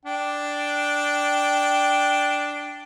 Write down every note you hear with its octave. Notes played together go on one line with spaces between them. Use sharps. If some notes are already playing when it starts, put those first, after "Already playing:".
D4 G5